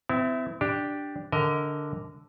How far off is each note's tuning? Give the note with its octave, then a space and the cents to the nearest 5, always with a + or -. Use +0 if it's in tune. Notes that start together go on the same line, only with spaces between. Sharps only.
C4 -40 E4 +0
D4 +0 G4 +0
D3 -5 A#4 -5 D#5 +25